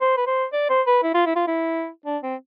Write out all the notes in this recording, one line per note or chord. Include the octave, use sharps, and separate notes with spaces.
C5
B4
C5
D5
C5
B4
E4
F4
E4
F4
E4
D4
C4